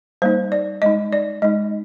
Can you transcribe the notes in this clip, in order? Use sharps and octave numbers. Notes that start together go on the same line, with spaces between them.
G3 A#3 D#4 C5
D5
G#3 D#4 D#5
D5
G#3 D#4 D#5